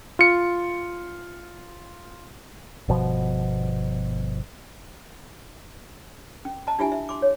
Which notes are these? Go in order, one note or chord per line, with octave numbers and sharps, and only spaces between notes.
F4 C#7
G1 B2 F3
C#4
D#5 A5 A#5
D4 E4 F4 G4 E5 G#5
E5
C6 D6
C#5